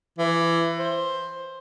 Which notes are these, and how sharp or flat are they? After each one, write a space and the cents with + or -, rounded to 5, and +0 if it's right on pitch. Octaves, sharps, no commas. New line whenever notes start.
E3 +25
C5 +10